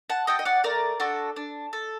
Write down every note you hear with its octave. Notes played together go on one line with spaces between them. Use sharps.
F#5 A5
F#4 A4 D#5 G5
D#5
D5 F#5
A3 A#4 D5
D4 F#4 A4
D4
A4